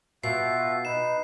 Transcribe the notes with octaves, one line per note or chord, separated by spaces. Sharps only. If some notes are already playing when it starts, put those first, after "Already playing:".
B2 F4 F#4 E5 C7
D#4 B4 E7